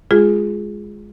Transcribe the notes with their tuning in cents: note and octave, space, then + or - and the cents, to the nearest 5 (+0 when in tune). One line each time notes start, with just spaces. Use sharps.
G#3 +0 F4 +5 G#4 +0